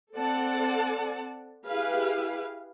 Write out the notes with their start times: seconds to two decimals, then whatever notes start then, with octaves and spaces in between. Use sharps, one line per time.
0.16 C4 A4 D5 F#5 A5
1.66 E4 G4 G#4 B4 F5